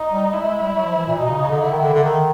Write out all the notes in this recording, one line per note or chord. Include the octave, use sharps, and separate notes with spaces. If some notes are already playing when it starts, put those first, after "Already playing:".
Already playing: D#4
G3
G#3 E4
G#3
G3
F#3
F3
E3
A#2
B2 D#4
C#3
C#3
D3
D3 E4
D#3
D3
D3
D#3